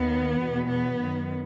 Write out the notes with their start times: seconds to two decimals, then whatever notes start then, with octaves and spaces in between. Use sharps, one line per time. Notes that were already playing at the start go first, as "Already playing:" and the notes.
Already playing: D#2 D#3 B3
0.40 E2 B2
0.70 B3
0.99 F#2 D#3